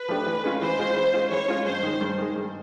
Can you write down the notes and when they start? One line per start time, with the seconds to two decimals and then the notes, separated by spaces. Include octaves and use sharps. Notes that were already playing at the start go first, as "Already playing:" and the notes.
Already playing: B4
0.09 F3 A3 D4 G4
0.26 E3
0.44 G#3 C#4 F4
0.61 E3 C5
0.79 G#3 C#4 F4
0.96 E3
1.14 G#3 C#4 F4
1.32 E3 C#5
1.48 G#3 C#4 F4
1.66 G2 C5
1.83 D#3 G#3
2.01 G2
2.18 D#3 G#3
2.36 G2